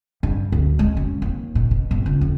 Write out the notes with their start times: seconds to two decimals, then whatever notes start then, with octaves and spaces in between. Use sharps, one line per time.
0.23 G2
0.52 D2
0.79 G#3
0.97 F#2
1.22 D#2
1.55 A#2
1.71 B2
1.91 G1
2.06 C#2
2.21 F2